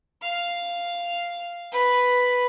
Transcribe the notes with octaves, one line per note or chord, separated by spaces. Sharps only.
F5
B4